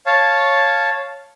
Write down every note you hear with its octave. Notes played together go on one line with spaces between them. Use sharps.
C#5 F5 A5